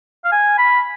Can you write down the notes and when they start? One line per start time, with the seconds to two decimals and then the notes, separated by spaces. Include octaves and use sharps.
0.25 F5
0.32 G#5
0.58 B5